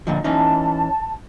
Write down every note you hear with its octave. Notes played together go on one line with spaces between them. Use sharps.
A#2 D3 F3 D#5
E3 C#4 D#4 A5